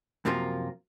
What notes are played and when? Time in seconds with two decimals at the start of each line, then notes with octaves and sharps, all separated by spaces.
0.25 F#2 C3 F3 A#3 F4